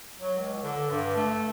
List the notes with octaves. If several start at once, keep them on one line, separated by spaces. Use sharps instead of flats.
F#3
C#2
D3
G2
A3